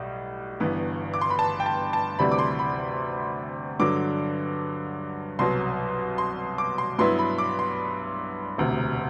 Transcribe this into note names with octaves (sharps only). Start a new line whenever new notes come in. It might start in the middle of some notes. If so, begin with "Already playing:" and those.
Already playing: B1 A2 G3
G1 G2 E3 B3
D6
C6
B5
A5
G5
A5
A5
D2 C3 E3 G3 B5
D6
C6
B5
G2 D3 F#3 D6
C2 B2 F#3 C6
C6
D6
C6
G2 F#3 B3 E4 C6
B5
D6
C6
E1 D2 C3